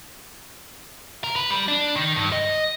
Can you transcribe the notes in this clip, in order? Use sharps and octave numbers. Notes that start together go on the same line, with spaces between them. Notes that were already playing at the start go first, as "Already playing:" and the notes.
A#4
B4
G3
D4
D#3
G2
D#5